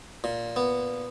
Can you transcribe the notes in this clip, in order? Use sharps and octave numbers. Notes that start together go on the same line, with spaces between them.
A#2
B3